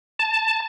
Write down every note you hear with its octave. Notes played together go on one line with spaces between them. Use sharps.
A5